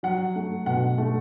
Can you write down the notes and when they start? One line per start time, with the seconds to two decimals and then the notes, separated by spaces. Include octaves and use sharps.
0.03 F#3 F#5
0.36 A3
0.66 B2 F#5
0.98 A3